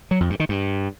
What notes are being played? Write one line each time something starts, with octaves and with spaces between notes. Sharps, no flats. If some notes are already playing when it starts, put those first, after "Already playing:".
F#3
F2
G2
D#3
G2